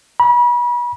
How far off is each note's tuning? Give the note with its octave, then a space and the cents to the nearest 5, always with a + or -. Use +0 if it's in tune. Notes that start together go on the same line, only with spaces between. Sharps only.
B5 -35